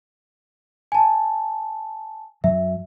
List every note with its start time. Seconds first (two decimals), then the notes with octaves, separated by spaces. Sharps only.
0.92 G#5 A5
2.44 F#2 F#3 E5